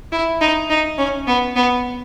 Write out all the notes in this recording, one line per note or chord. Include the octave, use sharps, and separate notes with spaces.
E4
D#4
D#4
C#4
B3
B3